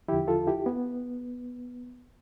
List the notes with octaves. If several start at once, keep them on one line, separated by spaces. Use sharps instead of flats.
E2 D3 F3 E4 G4
F4 A4
E4 G4
B3